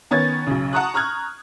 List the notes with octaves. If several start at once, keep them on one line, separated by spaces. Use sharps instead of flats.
D#3 B3 C#4 G#6 A6
B1 C#3
F#5 A5 A#5 C#6 D#6 F#6
A#5 C#6 F6 F#6 G#6